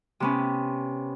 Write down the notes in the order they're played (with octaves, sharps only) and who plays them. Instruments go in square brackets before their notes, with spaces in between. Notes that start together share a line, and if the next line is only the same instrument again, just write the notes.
[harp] C3 B3 C#4